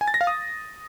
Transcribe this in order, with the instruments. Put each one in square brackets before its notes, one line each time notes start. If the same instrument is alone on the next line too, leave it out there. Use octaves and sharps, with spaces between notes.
[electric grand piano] G#5
A6
A#6
F5
D#6